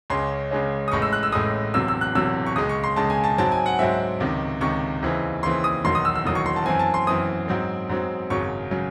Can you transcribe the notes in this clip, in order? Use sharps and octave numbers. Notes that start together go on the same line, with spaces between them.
C#2 C#3 G#3 C#4 C6
C#2 C#3 G#3 C#4
D#6
A1 A2 G#3 C#6
E6
F#6
E6
A1 A2 G#3 D#6
E1 E2 C3 F#3 E6
E6
F#6
E1 E2 C3 F#3 E6
C#6
C#2 C#3 G#3 D#6
C#6
C6
C#2 C#3 G#3 A5
G#5
A5
G#2 F#3 C4 A5
G#5
F#5
G#2 F#3 C4 E5
C#2 C3 D#3
C#2 C3 D#3 C#6
D#2 C#3 E3 C4
D#2 C#3 E3 C4 C6
D#6
E1 E2 D#3 F#3 C6
D#6
E6
E6
E1 E2 D#3 F#3 D#6
C#6
C6
A5
F#2 E3 C4 G#5
A5
C6
F#2 E3 C4 D#6
G#2 F#3 C4
G#2 F#3 C4
G#1 F#2 C#3 F#3 C#6
C#3 F#3